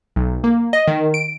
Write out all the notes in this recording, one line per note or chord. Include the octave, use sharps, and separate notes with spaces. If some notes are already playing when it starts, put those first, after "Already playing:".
B1
A#3
D#5
D#3
D7